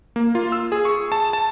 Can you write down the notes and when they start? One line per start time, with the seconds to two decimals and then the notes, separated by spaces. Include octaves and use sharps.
0.16 A#3
0.35 F4
0.52 E6
0.72 G#4
0.85 C#6
1.12 A5
1.33 A5